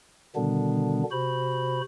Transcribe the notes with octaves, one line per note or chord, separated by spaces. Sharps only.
B2 D3 D#3 G3 B3 D4
C3 F#4 C5 B5